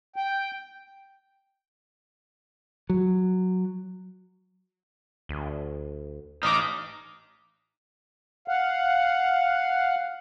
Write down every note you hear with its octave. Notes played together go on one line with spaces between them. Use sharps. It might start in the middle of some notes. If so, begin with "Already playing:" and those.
G5
F#3
D2
A1 D#4 D#5 D6 F6
F5 F#5